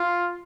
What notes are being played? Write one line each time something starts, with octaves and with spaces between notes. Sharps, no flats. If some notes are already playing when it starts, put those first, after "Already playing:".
Already playing: F4